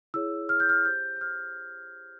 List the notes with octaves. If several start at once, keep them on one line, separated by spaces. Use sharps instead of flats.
E4 G#4 C#5 E6
F6
G6
F6
G4 C5 G6
G6
F6